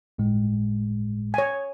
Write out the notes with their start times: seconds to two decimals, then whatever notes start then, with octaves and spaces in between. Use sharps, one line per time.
0.18 G1 A2 G#3
1.34 C#5 G#5